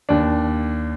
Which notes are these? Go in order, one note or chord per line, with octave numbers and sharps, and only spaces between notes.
D#2 D4